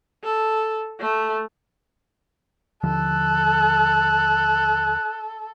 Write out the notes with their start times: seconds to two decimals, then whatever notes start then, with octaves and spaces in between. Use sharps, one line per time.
0.24 A4
1.00 A3
2.83 D#2 D3 F3 A4 F#6